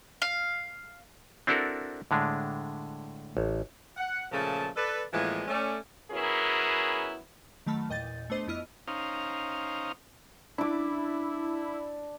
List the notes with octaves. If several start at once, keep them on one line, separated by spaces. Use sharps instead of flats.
F5
C4 D4 E4 F#4 A4 A#4
A2 D3 G#3 D4
A1
F#5
A#2 C#3 F3 A3 A5
A4 B4 D5
A2 E3 F3 G#3 A#3 B3
A3 C#4 D5
F#3 B3 C#4 E4 G#4 A#4
D#3 F#3 A3 A5 B5 F6
E2 A#2 D#5 G5 G6 A6
A3 B3 D4 C5 D#5
F2 B3 E4 D#5 F6
C#4 D#4 C5 F5 A#5
D4 E4 D6